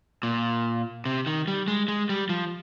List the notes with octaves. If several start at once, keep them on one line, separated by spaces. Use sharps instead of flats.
A#2
C3
D#3
G3
G#3
G#3
G3
F3